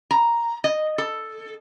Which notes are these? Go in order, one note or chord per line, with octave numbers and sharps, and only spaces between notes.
A#5
D#5
A4